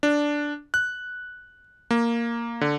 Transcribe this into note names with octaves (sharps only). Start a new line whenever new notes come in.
D4
F#6
A#3
D3